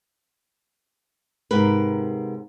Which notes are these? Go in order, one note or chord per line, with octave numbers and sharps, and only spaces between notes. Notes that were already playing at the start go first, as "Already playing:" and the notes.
G#2 C3 G4 A#4 B4